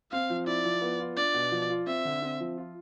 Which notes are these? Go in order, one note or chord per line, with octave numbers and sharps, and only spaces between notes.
C4 F5
F3
E4 D5
F3
B3
F4
D4 D5
B2
F3
F4
C4 E5
D3
C4
F3
F4